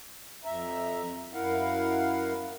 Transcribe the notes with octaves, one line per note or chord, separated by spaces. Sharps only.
F2 E5 A#5
F#2 E4 A#4 F5 F#5